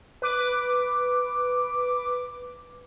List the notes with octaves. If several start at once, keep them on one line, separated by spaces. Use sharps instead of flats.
B4 D6